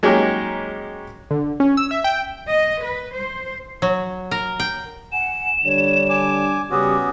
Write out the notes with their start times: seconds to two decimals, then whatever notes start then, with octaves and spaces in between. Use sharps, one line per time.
0.03 F#3 G#3 A#3 C#4 D#4 G4
1.31 D3
1.60 C#4
1.77 E6
1.91 E5
2.04 G5
2.49 D#5
2.83 B4
3.15 C5
3.82 F#3
4.31 A#4
4.60 G5
5.12 F#5 G#5 E7
5.65 D3 G3 D4 C#5
6.10 G#5 D6
6.71 C#3 G3 B3 C#4 F#4 G4 D6 D#6